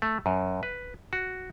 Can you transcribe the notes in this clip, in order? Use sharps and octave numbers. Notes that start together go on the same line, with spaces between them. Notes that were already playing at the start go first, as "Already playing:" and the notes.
A3
F#2
B4
F#4